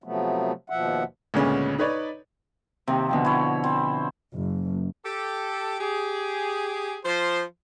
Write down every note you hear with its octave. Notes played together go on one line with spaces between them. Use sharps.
C3 F3 F#3 A3 B3
D#2 B2 F3 E5 F#5
D2 A#2 C#3 G#3 B3 C#4
D#4 B4 C#5 D5
D#2 C3 C4
B2 D3 F3
E4 C#5
C4
F#1
G4 A4
G4 G#4
F3 C5